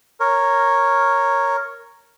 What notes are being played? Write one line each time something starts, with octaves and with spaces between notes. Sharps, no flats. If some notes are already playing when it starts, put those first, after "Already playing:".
A#4 C#5